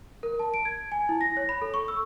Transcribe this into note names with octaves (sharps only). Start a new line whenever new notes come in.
A#4
A5
D7
G#6
G#5
E4
A#6
C#5
B5
A4
C#6
E6